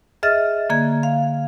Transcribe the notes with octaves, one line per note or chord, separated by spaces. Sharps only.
G#4 D#5 E5 F6 A6
D3 A#3 G#6
F5